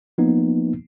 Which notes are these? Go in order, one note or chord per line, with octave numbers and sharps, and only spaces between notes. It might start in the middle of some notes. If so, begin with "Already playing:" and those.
F3 A#3 B3 D#4